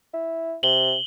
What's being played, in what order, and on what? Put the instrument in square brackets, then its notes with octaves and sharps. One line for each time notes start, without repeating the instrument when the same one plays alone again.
[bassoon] E4
[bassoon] C3 [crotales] F#7 G7